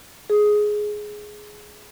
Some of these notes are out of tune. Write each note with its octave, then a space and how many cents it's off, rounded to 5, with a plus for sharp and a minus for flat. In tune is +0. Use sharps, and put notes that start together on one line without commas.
G#4 +10